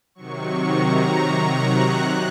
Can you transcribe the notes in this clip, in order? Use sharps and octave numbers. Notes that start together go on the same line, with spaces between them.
C3 D#3 F#3 C#6
A#5
F#6
C3